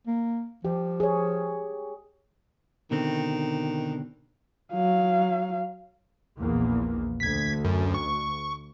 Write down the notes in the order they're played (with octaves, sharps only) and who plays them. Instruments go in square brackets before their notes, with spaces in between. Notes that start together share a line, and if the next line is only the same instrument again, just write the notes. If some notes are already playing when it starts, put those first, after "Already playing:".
[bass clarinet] A#3
[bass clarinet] F3 [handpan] G4
[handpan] G#4 C#5
[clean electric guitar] B2 D3 C4 [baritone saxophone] D#3
[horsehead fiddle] F#3 F5
[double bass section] A#1 E2 A#3
[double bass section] D2 [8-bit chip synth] G#6 B6
[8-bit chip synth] F#2
C#6